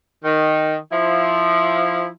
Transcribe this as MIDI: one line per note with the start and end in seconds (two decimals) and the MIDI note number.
0.24 0.75 51
0.91 2.07 53
0.91 2.07 64